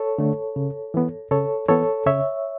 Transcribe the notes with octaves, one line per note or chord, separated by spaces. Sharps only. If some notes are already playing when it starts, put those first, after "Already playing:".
Already playing: A4 C#5
D3 A3
C#3
E3 B3
C#3 A4 C#5
E3 B3 A4 C#5
C#3 C#5 E5